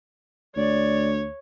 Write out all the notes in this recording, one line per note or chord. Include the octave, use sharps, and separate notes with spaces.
D2 C#5 D5